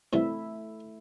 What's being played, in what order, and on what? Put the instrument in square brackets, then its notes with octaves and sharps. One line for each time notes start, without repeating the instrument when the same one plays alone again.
[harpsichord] C3 E3 G3 [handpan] A3 E4 E5